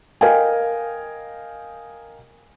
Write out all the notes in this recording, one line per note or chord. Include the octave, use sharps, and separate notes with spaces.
A#4 D#5 F5 G5 G#5